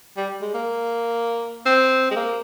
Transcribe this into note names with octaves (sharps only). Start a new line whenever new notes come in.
G3
G#3
A#3
C4
G#3
A#3